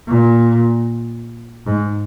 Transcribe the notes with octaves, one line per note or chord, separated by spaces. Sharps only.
A#2
G#2